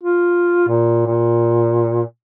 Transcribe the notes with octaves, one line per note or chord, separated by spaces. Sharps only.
F4
A#2
A#2